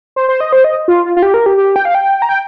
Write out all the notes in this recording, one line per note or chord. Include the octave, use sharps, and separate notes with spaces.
C5
C5
D#5
C5
D#5
F4
F4
F4
G4
A#4
G4
G4
G5
F5
G5
A#5
G5